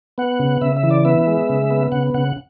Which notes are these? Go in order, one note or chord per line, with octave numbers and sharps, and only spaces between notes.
B3 F#5
C#3
C#3 E5
E5
E3
D5
B3 E5
G#3
C#3
B3
C#3 F#5
C#3 F#5